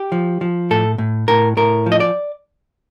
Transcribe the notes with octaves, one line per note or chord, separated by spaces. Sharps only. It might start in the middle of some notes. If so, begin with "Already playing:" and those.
Already playing: G4
F3
F3
A2 A4
A2
A2 A#4
A2 A#4
F3
D#5
D5